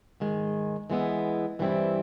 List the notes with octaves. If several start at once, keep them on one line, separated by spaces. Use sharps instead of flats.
G#2 D#3 G#3
E3 G#3 B3 E4
G2 E3 G3 C4 E4